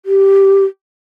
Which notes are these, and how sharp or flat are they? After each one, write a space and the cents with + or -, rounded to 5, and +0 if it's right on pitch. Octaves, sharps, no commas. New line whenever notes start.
G4 -5